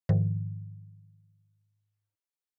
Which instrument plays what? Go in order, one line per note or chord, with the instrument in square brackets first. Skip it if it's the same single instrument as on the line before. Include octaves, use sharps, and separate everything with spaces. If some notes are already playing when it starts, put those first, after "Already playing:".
[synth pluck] G#2 D#3 F3